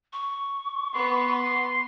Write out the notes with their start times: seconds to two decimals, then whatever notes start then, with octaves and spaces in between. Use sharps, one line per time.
0.13 C#6
0.94 B3 C6